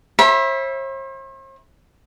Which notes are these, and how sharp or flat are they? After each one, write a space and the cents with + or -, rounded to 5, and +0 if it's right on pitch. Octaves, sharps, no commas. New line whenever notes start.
C5 +45 E5 +0 B5 -25